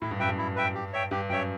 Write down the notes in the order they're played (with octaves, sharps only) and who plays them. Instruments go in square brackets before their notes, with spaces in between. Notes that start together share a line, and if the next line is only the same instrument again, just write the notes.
[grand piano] A2 [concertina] E4
[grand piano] G2
[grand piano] F#2 [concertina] B4 E5 G5
[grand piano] G2
[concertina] E4
B4 E5 G5
G4
C#5 E5 G5
[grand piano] G2 [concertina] G4
[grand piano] F#2 [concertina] C#5 E5 G5